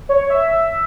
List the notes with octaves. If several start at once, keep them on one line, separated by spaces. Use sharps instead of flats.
C#5
E5